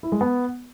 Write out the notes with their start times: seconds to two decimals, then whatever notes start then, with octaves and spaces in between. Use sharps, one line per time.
0.03 E4
0.12 G#3
0.21 B3